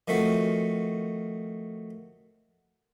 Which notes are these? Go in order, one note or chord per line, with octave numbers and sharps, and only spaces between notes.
D#3 F3 A3 C4 F#4